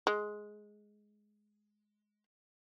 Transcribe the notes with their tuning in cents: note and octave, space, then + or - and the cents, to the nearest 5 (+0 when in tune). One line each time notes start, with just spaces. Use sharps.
G#3 +10